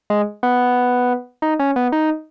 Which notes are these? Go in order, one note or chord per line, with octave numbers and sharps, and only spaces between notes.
G#3
B3
D#4
C#4
B3
D#4